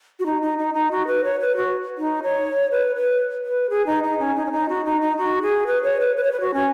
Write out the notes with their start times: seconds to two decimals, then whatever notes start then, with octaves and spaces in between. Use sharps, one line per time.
0.19 F#4
0.26 D#4
0.42 D#4
0.58 D#4
0.74 D#4
0.91 F#4
1.07 B4
1.24 C#5
1.40 B4
1.57 F#4
1.98 D#4
2.23 C#5
2.71 B4
2.96 B4
3.45 B4
3.70 G#4
3.87 D#4
4.04 D#4
4.19 C#4
4.36 D#4
4.45 C#4
4.52 D#4
4.69 F#4
4.85 D#4
5.01 D#4
5.18 F#4
5.42 G#4
5.67 B4
5.83 C#5
6.00 B4
6.16 B4
6.24 C#5
6.32 B4
6.41 F#4
6.54 C#4